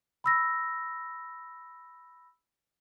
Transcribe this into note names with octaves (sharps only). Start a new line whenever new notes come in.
B5 E6 A#6